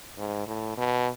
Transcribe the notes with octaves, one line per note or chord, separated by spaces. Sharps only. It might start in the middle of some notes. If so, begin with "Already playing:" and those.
G#2
A2
B2